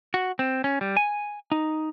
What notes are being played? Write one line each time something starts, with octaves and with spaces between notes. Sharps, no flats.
F#4
C4
C#4
G3
G#5
D#4